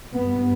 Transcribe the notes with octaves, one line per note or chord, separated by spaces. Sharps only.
G2 B3